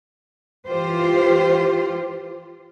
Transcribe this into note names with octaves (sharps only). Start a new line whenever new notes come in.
E3 F4 G4 C5